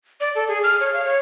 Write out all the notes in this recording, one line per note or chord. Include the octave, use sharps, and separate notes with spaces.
D5
A4
G#4
F6
C#5
F5
C#5